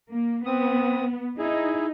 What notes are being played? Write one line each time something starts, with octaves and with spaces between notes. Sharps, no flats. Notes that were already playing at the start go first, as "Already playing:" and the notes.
A#3
B3 C4 D#6
D#4 E4 G#4